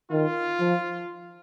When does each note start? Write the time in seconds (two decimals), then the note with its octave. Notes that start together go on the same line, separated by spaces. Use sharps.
0.11 D#3 F4
0.60 F3